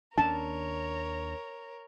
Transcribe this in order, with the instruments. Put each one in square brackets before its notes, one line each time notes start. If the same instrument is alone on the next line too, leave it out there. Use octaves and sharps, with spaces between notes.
[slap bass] D#2 C#4 D4 [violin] A#4 C#5 [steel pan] A5